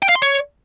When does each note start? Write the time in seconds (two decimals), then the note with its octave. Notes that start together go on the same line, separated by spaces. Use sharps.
0.02 G5
0.09 F5
0.15 C6
0.22 C#5